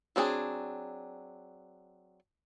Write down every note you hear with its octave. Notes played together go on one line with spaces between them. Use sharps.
F#3 C4 D4 G#4